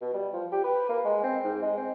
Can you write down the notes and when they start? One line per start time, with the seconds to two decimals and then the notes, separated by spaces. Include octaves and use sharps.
0.01 B2
0.14 G3
0.33 F3
0.52 G4
0.64 B4
0.89 A#3
1.05 G#3
1.23 C4
1.44 G#2
1.62 G#3
1.77 C4